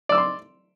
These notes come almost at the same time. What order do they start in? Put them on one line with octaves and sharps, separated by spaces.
D5 E6 D6 C6